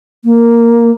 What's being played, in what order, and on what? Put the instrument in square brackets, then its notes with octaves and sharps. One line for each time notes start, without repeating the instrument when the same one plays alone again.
[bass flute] A#3